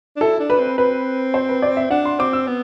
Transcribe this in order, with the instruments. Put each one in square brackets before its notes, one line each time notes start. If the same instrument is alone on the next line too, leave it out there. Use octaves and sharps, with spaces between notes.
[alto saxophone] D4
[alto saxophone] E4 [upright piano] A4
[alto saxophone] D4
[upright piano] B4
[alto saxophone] C4
[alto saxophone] C4 [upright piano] B4
[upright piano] C5
B4
D5
E5
[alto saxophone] D4 [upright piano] F#5
[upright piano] C6
[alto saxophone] C4 [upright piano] D6
[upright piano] E6
[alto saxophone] B3